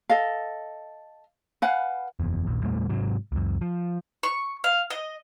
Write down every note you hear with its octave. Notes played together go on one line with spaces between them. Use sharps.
A4 D#5 F5
B4 F5 F#5 G#5
F#1 E2
D#1 A#1
E2 A#2 G3 A3
G#2 C3 F#3
C#2 F#2
F3
C#6
F5
D#5